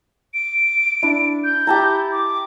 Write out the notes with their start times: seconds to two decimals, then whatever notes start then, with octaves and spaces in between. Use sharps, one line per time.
0.34 D7
1.03 D4 E4
1.44 G6
1.67 E4 G4 A5 A#5
2.12 D6